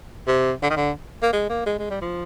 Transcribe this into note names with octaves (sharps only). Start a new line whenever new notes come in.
C3
D3
D#3
D3
A#3
G#3
A#3
G#3
G#3
G3
F3